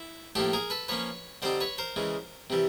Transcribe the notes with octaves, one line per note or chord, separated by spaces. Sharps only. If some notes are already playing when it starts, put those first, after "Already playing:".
Already playing: E4
A2 F3 A#3 G4 A4
G#4 A#4
A4 B4
F3 A#3 C#4 B4 C#5
D3 G3 C4 D#4 C5 D5
B4 C#5
A#4 C5
C#3 E3 G#3
C3 E3 G3